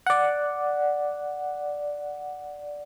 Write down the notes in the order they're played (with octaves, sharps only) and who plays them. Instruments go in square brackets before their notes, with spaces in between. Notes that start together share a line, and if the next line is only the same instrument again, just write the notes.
[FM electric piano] D5 F#5